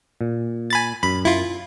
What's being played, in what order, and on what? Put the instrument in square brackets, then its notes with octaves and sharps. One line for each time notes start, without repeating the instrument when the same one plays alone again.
[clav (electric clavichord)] A#2
[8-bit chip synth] G#5 B5 A6
[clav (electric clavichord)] F#2 [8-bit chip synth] B5
[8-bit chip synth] E4 F4